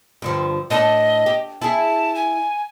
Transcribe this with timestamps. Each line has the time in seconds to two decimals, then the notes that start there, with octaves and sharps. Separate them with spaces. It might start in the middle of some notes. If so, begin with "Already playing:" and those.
0.22 G2 D3 F3
0.70 A2 D4 A4 D#5
1.26 G4
1.62 E4 G#4 A5
2.15 G#5